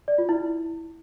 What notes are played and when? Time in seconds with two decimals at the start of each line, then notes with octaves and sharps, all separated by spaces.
0.08 D5
0.18 F4
0.29 E4